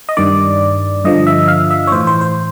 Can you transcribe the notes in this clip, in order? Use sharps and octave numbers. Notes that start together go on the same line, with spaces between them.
D#5
G2 D#3 D5
G2 D3 F3 D#5
E5
F5
E5
C#5
A2 E3 C5
C5
C5